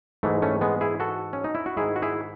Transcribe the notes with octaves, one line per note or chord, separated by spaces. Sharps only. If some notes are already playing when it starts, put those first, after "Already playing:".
G#2 E3 G#3 A3
A3 C#4
G#3 B3
E4 G#4
F#4 A4
C#4
D#4
E4
F#4
G#2 D#3 G#3 E4 G#4
F#4
E4 G#4